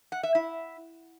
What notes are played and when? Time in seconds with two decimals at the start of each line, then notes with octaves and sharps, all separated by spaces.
0.12 F#5
0.23 E5
0.35 E4